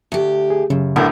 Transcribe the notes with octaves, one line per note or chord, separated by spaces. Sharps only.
D2 G4
G#4
F#2 C#3
B1 A2 D3 A#4